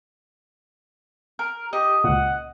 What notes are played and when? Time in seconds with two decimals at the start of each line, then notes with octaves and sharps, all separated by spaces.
1.39 A#4
1.73 G4 D#5
2.04 C#2 A#2 F#5